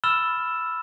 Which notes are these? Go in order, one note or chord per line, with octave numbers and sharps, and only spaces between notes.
B5 E6 F6 A6 E7 G7